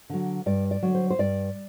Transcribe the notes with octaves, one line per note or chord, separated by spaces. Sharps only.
D3 F#3
G2 D5
D5
D3 F#3
C5
C5
G2 D5